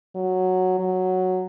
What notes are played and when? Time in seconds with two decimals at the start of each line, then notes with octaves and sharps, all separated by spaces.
0.15 F#3
0.79 F#3